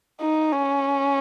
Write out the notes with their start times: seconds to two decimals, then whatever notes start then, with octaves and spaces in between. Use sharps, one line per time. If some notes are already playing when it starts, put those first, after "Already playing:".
0.20 D#4
0.51 C#4